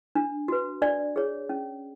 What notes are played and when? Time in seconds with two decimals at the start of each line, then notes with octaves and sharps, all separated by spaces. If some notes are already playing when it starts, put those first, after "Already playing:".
0.15 D4
0.48 F#4 B4
0.82 D4 D5
1.16 G#4 C#5
1.49 C#4